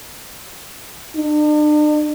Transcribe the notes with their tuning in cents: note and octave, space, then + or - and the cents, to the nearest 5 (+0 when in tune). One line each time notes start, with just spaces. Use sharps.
D4 +40